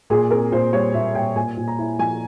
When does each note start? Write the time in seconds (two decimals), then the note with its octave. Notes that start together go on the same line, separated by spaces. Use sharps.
0.10 A#2 G#4
0.31 C4 A#4
0.52 A#2 C5
0.73 G3 C#5
0.94 A#2 E5
1.15 A#2 G5
1.36 A#2 G#5
1.57 A#2
1.68 A#5
1.78 E4
1.99 F3 G#5